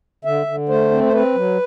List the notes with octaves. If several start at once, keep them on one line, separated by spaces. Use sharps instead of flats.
D3 E5
D3
A3 C5
C4
C5
C4 B4
F#3